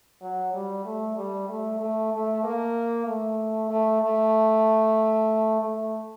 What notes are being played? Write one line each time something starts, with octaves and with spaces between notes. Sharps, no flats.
F#3
G3
A3
G3
A3
A3
A3
A#3
A3
A3
A3
A3